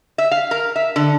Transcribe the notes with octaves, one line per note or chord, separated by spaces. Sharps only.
E5
F5
A#4
E5
D3